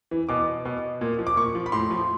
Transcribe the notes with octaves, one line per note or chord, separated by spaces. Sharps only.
E3
B2 D6
B2
A#2
F3
D6
A#2 C#6
F3
B5
A2 C6
F3